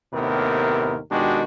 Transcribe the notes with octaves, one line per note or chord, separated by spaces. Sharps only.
D#2 A2 C3 B3 A#4
B2 D#3 G#3 D4 F#4 G4